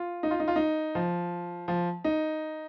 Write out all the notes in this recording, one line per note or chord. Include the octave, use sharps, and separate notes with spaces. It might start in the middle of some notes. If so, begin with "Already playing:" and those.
Already playing: F4
D#4
F4
D#4
F4
D#4
F3
F3
D#4